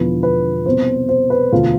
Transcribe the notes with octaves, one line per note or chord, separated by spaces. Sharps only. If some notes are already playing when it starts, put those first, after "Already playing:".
Already playing: E1 E2 D3 F3 B4
B4
C2 B2 C5
C5
B4
E1 D2 D3 F4